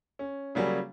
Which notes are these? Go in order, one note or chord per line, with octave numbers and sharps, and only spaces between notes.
C#4
C#3 F#3 G3 A#3 C#4